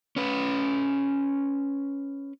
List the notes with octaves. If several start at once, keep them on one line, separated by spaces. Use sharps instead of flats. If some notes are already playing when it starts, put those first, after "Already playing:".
C#4 B4